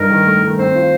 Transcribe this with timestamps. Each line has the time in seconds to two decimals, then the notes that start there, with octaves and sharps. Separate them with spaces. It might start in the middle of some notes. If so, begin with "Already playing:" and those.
Already playing: G2 D#4 A#4
0.10 D#3
0.26 A3
0.42 D#3
0.59 C4 C5
0.75 F4